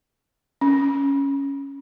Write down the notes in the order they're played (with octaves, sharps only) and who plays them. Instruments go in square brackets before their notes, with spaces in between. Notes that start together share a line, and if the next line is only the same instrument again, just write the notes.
[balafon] C#4